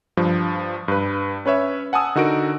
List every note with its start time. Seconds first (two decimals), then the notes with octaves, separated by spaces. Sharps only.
0.17 G2 F3
0.88 G2 B4
1.46 C#4 B4 C#5 E5
1.93 F#5 G#5 A5 D#6 E6
2.16 D3 D#4 F#4 A#4 D7